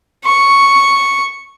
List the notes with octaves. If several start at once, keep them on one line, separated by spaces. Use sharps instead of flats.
C#6